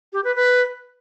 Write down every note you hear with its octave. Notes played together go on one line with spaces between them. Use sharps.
G4
B4
B4